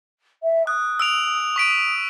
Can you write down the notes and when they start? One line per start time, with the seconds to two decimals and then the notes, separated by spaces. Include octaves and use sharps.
0.43 E5
0.67 D#6 F#6
1.00 E6 D7 F7
1.56 C#6 B6 D7